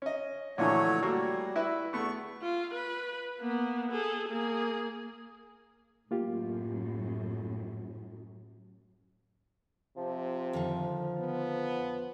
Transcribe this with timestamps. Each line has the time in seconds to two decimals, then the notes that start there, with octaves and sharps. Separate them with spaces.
0.02 C#4 D#5
0.58 A#1 D3 E3 F#3 A3 F4 C#5 G#5
1.03 G3 A3 A#3 F#4
1.56 E4 B4 E5
1.93 E2 A3 B3 C#6
2.42 F4
2.74 B4
3.40 A#3 B3
3.91 G#4 A4
4.28 A#3 G#4
6.11 F#2 A2 A#3 F4 G4
9.97 C3 F3
10.53 F2 D3 D#3
11.20 B3